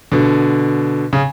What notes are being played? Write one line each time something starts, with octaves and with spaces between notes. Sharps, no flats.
B2 D3
C#3